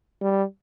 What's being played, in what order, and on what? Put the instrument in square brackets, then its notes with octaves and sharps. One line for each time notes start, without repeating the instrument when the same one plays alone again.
[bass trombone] G3